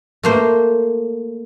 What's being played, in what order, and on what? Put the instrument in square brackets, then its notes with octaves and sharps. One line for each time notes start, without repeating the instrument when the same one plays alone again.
[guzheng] A3 A#3 C5